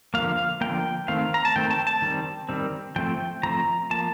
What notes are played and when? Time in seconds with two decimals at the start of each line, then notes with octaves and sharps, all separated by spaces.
0.14 D3 F3 A#3 F5
0.61 D3 F3 A#3 G5
1.08 D#3 A3 C4 F5
1.34 A#5
1.45 A5
1.56 D#3 A3 C4 G5
1.70 A5
1.87 A5
2.02 D#3 G3 C4
2.49 D#3 G3 C4
2.96 F3 A3 C4 G5
3.43 F3 A3 C4 A#5
3.91 F3 A#3 A5